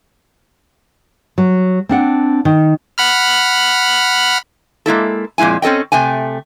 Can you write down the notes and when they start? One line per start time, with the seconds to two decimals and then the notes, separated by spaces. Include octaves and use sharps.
1.38 F#3
1.89 C4 D4 F#5
2.45 D#3
2.98 F#5 B5 F6
4.86 G#3 A#3 E4 A4
5.38 F2 A#2 G#3 E4 G#5
5.62 C4 C#4 A4 D#5 G5
5.92 C3 A3 G5 G#5